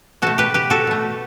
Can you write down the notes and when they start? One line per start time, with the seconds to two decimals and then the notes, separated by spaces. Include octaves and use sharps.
0.22 B2 A3 F#4 A4
0.38 G4 B4
0.54 G4 B4
0.70 F#4 A4
0.87 B2 A3